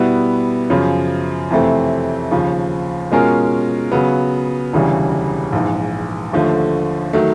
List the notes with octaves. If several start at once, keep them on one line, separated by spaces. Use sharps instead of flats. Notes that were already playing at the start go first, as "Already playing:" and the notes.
Already playing: B2 G3 B3 E4
F#2 C#3 F3
F2 C3 E3 A3 C4
D#2 C#3 F3
B2 G#3 C#4 F4 A#4
C#3 F#3 B3
E1 D2 C#3 E3 G3
A#1 G#2 E3
D#2 D3 F3 A3
D#3 F#3 A3